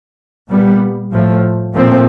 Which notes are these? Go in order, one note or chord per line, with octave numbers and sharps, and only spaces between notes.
A#2 G3 B3
A2 F3 A3
A#2 F3 A3 C4